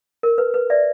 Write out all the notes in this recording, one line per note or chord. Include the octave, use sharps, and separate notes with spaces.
A#4
B4
B4
D5 E5